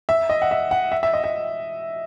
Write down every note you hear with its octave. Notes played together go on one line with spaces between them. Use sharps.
E5
D#5
F#5
E5
F#5
E5
E5
D#5
E5